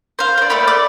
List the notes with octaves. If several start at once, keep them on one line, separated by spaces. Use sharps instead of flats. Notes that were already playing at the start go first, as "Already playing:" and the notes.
C5 F5
C5 D5
A3 A#3 D5 B5
D5